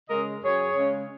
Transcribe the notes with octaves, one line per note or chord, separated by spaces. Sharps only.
C#3 G#3 C#4 A#4 D#5
F#2 G#4 C#5
C#3 G#3 C#4